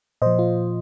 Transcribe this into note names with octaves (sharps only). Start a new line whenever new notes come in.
A#2 F3 C5 D#5
F4